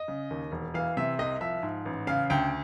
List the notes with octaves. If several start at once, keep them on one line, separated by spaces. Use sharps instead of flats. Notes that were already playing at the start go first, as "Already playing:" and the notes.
Already playing: D#5
C#3
D#2
E1
E3 F5
C3 E5
C2 D#5
F3 E5
G#2
A1
C#3 F5
D2 G5